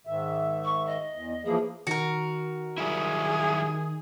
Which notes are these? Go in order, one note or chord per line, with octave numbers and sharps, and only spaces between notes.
G#2 D#3 E5
C#6
D#5
E2
E3 F3 A#3 G#4
D#3 F#4 A#4
F#3 G3 E4 G#4